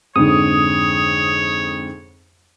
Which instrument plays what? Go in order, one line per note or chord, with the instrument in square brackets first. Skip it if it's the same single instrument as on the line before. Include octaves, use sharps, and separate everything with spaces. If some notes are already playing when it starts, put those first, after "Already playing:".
[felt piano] F2 G#2 D3 [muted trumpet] C#5 [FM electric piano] D#6